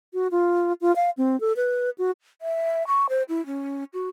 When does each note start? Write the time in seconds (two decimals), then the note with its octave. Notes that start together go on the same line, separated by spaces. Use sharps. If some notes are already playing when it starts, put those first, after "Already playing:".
0.13 F#4
0.31 F4
0.81 F4
0.96 F5
1.17 C4
1.40 A4
1.56 B4
1.98 F#4
2.41 E5
2.87 C#6
3.09 C5
3.29 E4
3.46 C#4
3.93 F#4